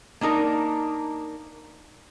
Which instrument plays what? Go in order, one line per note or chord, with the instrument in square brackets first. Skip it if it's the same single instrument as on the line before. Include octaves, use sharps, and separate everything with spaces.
[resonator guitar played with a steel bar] A#3 D4 D#4 A#4